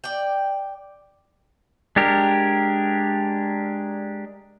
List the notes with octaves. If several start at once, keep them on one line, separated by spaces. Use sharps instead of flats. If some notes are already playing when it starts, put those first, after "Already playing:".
D5 G5
G#3 D4 G4 A#4